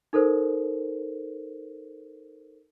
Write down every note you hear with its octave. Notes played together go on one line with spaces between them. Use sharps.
D#4 A4 A#4 C5